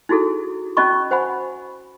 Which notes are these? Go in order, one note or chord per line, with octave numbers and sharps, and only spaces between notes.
D#4 E4 F#4 G#4 A4
C#4 F#4 D#5 A5 B5 C#6
C5 F#5 G#5 B5